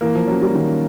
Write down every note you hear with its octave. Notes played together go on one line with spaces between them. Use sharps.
E3 A#3
F3
F#3 C#4
G3
D#3